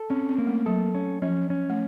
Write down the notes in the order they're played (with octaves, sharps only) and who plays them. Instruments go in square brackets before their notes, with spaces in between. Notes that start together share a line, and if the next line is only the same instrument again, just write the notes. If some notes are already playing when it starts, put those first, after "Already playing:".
Already playing: [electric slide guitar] A4
[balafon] C4 [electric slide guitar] C#4
[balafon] C4
[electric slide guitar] A#3
[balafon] A3
[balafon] F#3 [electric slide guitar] A4
[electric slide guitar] C#4
[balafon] F3 [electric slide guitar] C#4
[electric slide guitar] C#4
[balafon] A3